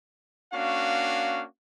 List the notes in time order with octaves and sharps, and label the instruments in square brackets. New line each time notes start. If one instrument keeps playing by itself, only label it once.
[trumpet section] A#3 C#4 D4 F#4 F5